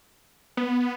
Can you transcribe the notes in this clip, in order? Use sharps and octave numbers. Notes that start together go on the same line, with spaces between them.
B3